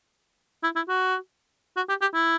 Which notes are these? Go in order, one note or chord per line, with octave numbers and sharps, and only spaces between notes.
E4
E4
F#4
F#4
G4
G4
E4